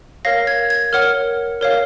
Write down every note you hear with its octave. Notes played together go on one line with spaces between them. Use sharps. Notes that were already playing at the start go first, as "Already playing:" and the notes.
A#4 C#5 F5 A#6
G#6
G#6
A#4 C#5 F#5 F6
A#4 C#5 F5